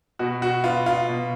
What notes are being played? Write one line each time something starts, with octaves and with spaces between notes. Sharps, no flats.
B2 F#4
F#4
B3 F4
F4
B2